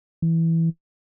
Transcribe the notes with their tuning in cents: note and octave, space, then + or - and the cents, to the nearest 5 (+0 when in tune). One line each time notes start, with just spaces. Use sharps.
E3 -5